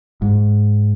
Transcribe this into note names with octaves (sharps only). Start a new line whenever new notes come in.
G#2